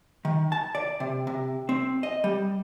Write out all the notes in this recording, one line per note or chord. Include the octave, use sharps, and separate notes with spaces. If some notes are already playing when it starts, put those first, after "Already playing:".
D#3
A5
D5
C3
C3
C4
D#5
G3